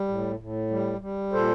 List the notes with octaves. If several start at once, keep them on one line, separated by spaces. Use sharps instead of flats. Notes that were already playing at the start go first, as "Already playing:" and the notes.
Already playing: G3
A2
A2
G3
G3
A#2 A4 C5